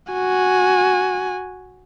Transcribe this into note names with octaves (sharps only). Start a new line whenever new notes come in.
F#4 G#5